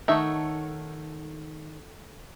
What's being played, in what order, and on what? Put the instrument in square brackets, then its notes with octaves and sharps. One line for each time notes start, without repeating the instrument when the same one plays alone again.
[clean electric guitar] D#3 [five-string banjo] A3 E5 [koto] D#4 [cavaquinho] A4 C#5 F#5